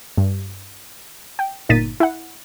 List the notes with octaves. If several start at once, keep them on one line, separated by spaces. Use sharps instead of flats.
G2
G5
G1 A#2 D#4 A6 B6 D#7
E4 F#5